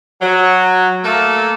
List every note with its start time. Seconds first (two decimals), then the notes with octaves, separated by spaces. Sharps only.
0.21 F#3
1.04 A3 A#3 A4